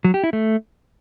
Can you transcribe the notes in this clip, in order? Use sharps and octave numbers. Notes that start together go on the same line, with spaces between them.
F#3
G4
E4
A3